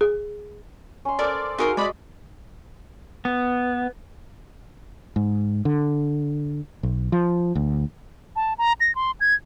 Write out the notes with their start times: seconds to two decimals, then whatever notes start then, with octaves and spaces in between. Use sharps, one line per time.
0.01 G#4
1.05 C#4 C6
1.19 A4 A#4 C5 D5
1.58 D#4 F#4 G#4 A#4 F5 C6
1.77 G#3 D5 D#5 G#5 B5 C#6
3.25 B3
5.16 G#2
5.65 D3
6.83 B1
7.12 F3
7.55 D2
8.36 A5
8.58 A#5
8.81 A#6
8.95 C6
9.21 G#6